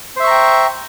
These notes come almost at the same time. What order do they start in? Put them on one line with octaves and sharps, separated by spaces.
C5 E5 C#6 A#5 G5